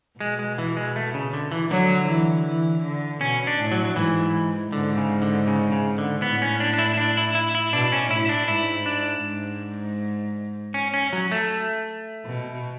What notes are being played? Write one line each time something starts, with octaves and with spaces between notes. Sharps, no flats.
B2 G#3
G#3
E3
G#3
A3
C#3
D3
E3
D3 F#3
E3
E3
D3
B2 C#4
D4
A2
F#3
F#3
G#2 E3
G#2 D3
C#3
D3
C#3
C#3
D3
A2 B3
C#4
D4
D4
E4
D4
E4
E4
E4
B2 D4
C#4
A2 E4
D4
G#2 E4
D4
G#2
C#4
C#4
F#3
A3
B2